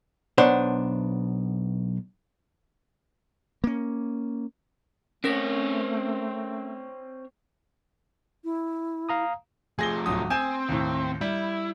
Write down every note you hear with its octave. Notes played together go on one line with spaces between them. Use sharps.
B1 B3 D4 C5 C#5 C6
A#3 C#4
A3 C4 C#4 A#4 C#5 A#6
E4
F5 A#5 D#6
F3 A3 G#4 A#6 G7
D1 F#3 D#6
C4 G#5 G6 E7
D#2 A2
G3 E4